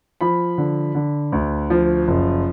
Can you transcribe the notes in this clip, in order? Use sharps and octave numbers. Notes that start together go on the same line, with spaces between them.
F3 B5
D3
D3
D2
F3
F#1